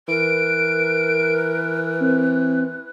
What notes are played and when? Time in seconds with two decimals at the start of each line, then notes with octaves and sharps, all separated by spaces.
0.08 E3 A#4 B4 D7
2.00 C4